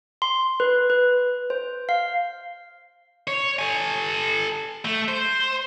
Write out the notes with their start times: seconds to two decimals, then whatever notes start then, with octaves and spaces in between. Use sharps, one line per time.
0.22 C6
0.60 B4
0.90 B4
1.50 C5
1.89 F5
3.27 C#5
3.59 A4 G#5
4.85 A3
5.09 C5